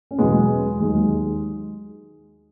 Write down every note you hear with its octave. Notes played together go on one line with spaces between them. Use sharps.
C#4
E2 B2 F#3 G#3 B3
D#2 D#3 F#3 G#3